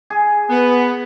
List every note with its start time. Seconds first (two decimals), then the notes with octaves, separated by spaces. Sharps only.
0.10 G#4
0.50 B3